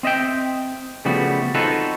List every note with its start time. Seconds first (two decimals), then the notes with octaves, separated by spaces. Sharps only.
0.03 C4 D#5 E5 G5
1.05 C#3 F3 G3 A3 B3 F#4
1.54 C4 D#4 F4 F#4 A4 B4